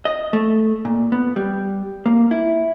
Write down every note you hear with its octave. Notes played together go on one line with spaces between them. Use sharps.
D#5
A3
A#2
B3
G3
A#3
E4